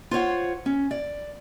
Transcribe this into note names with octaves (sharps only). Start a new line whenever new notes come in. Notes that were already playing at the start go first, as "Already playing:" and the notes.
F4 C5 C#5 F#5
C#4
D5